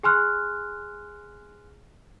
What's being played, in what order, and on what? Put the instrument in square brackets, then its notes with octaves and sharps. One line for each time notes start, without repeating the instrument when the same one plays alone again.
[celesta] G#4 G#5 C6 F6 F#6